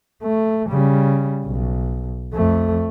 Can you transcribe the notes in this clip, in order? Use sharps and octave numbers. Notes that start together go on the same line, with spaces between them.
A3
C#3 G3
B1
F2 A3